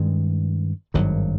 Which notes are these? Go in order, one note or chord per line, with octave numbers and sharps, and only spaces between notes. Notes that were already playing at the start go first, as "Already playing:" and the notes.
Already playing: G2 D#3 G#3 C#4
G#1 G2 D#3 F#3